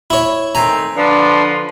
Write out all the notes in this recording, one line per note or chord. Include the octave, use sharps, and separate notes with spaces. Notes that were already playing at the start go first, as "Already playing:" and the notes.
E4 C#5
D#3 A3 C4 G#5 A#5
D3 F3 D4 B4 D5